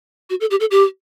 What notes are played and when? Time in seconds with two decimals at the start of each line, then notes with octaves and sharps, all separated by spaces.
0.30 F#4
0.41 A4
0.51 G4
0.60 A4
0.71 G4